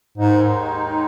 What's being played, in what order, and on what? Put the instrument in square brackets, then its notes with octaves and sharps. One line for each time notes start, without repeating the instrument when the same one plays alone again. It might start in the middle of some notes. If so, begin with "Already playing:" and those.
[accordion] D#2 D#3 G#3 D#4 [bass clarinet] G#2